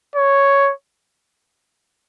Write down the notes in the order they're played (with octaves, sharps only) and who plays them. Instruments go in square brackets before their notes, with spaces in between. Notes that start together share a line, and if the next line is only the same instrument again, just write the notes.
[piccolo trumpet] C#5